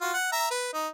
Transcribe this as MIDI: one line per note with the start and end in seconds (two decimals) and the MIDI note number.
0.01 0.13 65
0.01 0.13 66
0.13 0.31 78
0.32 0.47 76
0.32 0.47 82
0.51 0.69 71
0.73 0.88 63